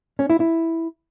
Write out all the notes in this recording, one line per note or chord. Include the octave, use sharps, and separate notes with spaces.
C#4
E4
E4